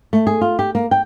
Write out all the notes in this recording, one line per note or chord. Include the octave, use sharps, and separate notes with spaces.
A3
G#4
F4
G4
A#3
G5